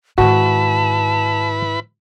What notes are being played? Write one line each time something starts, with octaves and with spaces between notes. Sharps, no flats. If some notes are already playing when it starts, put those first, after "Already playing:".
G#2 D#3 E4 F#4 B4 A5 B5